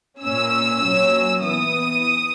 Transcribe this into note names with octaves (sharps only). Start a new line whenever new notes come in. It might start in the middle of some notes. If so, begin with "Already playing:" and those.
A#2 A#3 C#4 E6
A#2 F#3 C#4
E3 B3 D#6